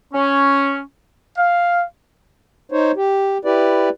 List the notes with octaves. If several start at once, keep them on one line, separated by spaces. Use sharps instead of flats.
C#4
F5
D#4 C5 C#5
G4
E4 G4 B4 D5